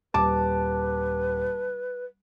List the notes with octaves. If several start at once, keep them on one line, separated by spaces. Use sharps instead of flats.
D#1 B4 A5 D6